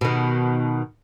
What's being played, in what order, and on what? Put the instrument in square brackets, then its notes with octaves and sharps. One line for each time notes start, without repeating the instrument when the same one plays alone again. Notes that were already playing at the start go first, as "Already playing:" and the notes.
[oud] B2 D#3